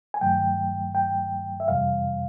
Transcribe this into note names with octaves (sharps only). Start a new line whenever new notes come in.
G#5
G2 D#3 F#3 A3 G5
G5
E5
F2 C3 E3 G3 F5